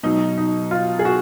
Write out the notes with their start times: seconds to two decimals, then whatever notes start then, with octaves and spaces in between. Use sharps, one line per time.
0.03 B2 F#3 D#4
0.38 D#4
0.71 F4
0.99 G#4
1.05 F#4